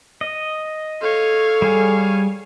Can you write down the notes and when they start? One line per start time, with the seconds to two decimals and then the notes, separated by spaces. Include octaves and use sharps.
0.21 D#5
1.02 A4 C#5 F5
1.62 G3 G#4